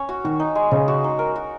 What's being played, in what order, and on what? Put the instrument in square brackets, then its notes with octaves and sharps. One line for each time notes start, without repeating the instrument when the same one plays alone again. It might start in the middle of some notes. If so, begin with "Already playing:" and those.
Already playing: [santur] C#4 C#5
F#4
[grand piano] D#3 [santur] F#4
[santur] D#4
G#3
[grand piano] C#3 [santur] G#3
[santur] F#4
D#4
A#4
F#4